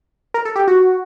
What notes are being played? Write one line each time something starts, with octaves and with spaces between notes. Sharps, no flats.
A#4
A4
G4
F#4